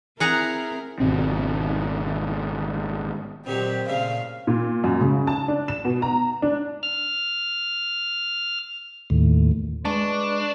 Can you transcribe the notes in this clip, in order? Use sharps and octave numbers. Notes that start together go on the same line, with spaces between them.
C4 E4 G#4 A#4 F#5 A#5
G#1 B2 C4
A#2 D#3 F#3 C4 G4
A#2 C#3 A3 F5
A#2
F#2
C#3
A5
D4
E7
B2
A#5
D4
F6
D#2 A2
G#3 D4 B4 D5 A5 C#6